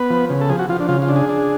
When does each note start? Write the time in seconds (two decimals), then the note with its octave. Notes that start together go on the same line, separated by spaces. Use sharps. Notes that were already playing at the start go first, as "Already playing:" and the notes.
Already playing: B3 B4
0.10 F3
0.30 C#3
0.41 A4
0.49 F3 G#4
0.59 F#4
0.69 F3 F4
0.80 D4
0.89 C#3 F4
1.02 F4
1.09 D4
1.16 G#4
1.29 D4